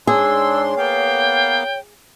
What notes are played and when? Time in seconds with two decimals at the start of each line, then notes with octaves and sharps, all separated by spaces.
0.07 G#2 D4 G#4 C#5 C6 E6
0.77 A#3 B3 F5 G5